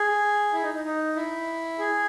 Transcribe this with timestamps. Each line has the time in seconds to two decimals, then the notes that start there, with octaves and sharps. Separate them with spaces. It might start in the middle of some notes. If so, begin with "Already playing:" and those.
Already playing: G#4
0.53 E4
0.63 D#4
0.74 D#4
0.84 D#4
1.16 E4
1.79 G#4